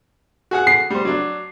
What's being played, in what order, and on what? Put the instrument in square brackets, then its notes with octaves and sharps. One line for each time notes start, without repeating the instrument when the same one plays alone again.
[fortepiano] F#4 G#4 F#5
[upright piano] C7
[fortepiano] G3 C5
F#3 D4